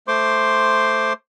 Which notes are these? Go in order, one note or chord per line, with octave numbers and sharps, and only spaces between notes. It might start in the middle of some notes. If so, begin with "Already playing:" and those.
A3 C5 C6 D6